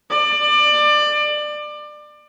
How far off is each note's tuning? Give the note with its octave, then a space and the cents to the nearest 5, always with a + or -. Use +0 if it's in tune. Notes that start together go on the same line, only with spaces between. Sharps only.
D5 +25